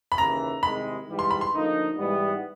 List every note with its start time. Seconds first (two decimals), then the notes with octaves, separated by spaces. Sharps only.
0.12 B5
0.18 D#2 C#3 E3 A#5
0.63 C2 C3 D#3 G#3 B5
1.08 G#2 E3 G3
1.19 C6
1.31 B5
1.41 C6
1.53 D2 D3 F3 A#3 D#4
1.97 G#2 E3 G3 B3